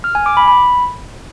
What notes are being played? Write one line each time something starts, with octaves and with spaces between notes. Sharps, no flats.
F6
G#5
D6
B5
B5